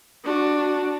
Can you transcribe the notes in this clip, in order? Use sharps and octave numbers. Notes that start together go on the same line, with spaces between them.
D4 F#4